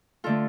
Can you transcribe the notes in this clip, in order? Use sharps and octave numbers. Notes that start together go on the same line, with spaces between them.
D3 A3 F4 A4